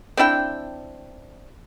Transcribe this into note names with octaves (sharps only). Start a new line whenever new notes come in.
C4 D4 E4 G5